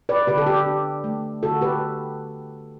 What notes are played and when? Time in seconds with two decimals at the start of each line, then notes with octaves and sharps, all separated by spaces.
0.09 B4 D5
0.27 D3 G4 B4
0.38 A4
0.46 G4
0.66 D4
1.04 A3
1.43 D3 F#4 A4
1.61 G4 B4